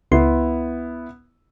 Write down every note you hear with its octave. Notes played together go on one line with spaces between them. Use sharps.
C#2 B3 E4 C6